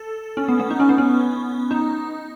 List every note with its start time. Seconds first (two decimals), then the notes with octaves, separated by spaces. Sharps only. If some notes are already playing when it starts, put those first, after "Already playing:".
Already playing: A4
0.37 C#4
0.48 B3
0.60 B3
0.70 D#4
0.80 C#4
0.89 B3
0.98 C#4
1.71 D#4